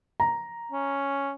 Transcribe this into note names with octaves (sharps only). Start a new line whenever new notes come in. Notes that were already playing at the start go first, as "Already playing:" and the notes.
A#5
C#4